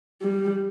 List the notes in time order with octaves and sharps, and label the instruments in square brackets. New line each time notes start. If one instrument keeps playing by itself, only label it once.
[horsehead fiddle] G3